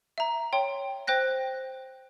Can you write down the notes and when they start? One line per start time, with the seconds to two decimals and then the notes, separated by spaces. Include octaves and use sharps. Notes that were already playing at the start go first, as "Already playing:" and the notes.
0.18 E5 A#5
0.53 C#5 G5 C6
1.07 C5 G5 F#6 A#6